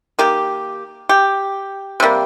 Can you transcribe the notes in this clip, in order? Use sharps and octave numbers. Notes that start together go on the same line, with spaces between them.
D#3 A#3 G4
G4
C3 G3 A#3